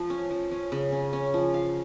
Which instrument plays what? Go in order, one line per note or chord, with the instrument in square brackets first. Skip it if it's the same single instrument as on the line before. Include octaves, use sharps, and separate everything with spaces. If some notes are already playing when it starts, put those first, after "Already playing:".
Already playing: [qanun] F3
C#4
F3
C#4
C#3
C#4
C#4
F3
F5